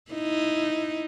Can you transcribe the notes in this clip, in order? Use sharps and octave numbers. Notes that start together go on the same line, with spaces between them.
D#4 E4